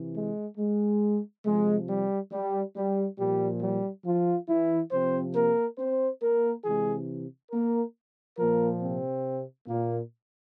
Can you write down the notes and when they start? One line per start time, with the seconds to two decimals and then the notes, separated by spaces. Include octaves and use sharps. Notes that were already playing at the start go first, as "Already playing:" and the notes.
Already playing: C3 E3
0.15 G#3
0.58 G#3
1.44 C3 F3 G#3
1.88 G3
2.32 G3
2.75 G3
3.18 A#2 F3 G3
3.61 G3
4.04 F3 F4
4.48 E3 E4
4.91 C3 F3 C4 C5
5.34 A#3 A#4
5.77 C4 C5
6.21 A#3 A#4
6.65 C3 E3 G#3 G#4
7.51 A#3 A#4
8.38 A#2 F3 A#3 A#4
8.81 C3 C4
9.68 A#2 A#3